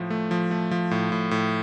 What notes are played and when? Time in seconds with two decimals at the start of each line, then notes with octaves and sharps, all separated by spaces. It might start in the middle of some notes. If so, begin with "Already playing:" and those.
Already playing: A2 F3
0.10 A3
0.31 F3
0.51 A3
0.71 F3
0.91 A2
1.12 A2
1.31 A2